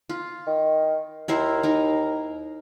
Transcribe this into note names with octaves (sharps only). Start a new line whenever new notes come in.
F4
D#3
D#2 E4 A#4 C5
D#4 A#4